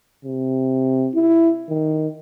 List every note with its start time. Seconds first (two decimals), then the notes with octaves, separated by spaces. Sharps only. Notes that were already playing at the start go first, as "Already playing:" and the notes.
0.25 C3
1.15 E4
1.69 D#3